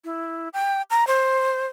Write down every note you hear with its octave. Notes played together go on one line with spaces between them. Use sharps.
E4
G5
A#5
C5